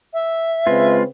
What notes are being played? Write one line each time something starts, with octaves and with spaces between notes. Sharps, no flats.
E5
C#3 G#3 C4 F4 B4